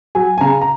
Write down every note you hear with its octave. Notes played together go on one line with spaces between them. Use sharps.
F#3 G#5
G#5
C#3 A#5
A#5